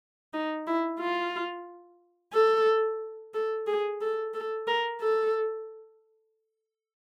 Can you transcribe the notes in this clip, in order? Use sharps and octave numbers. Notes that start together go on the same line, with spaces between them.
D#4
E4
F4
A4
A4
G#4
A4
A4
A#4
A4